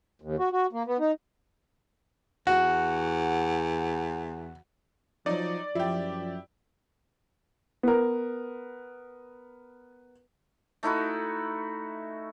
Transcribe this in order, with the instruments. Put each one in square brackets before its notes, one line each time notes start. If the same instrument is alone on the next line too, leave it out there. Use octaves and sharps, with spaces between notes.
[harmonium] D#2
F#4
F#4
A#3
B3
D#4
[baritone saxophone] E2 [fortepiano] F#4
[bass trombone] F3 [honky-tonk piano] F#3 D#4 [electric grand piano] D5
[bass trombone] F#2 [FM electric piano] F3 [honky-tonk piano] E4 G4
[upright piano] B3 A#4
[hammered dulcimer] A3 D#4 E4 F#4